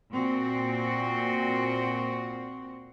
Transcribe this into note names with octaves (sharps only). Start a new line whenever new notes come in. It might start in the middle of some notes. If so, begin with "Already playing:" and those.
A#2 C4 F#4